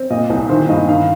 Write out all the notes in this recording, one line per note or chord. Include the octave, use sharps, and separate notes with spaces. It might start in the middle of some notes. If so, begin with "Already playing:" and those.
Already playing: C4
A#2 D#5
C2
D#3 C5
G2 D#5
D#3 F5